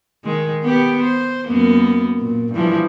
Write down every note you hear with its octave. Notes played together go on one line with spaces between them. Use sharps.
D#3 G#3
B3 G4
C5
F#2 A#3 B3
A#2
G2 E3 F3